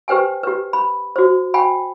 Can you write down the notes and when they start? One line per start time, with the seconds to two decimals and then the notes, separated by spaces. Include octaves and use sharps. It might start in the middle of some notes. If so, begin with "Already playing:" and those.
0.08 G4 B4 C5 G5 G#5
0.43 G4 B4
0.73 B5
1.16 F#4 C5
1.54 G5 G#5 B5